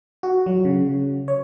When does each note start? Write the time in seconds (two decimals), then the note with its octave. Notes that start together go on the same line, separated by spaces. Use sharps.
0.23 F#4
0.46 F#3
0.65 C#3
1.28 C#5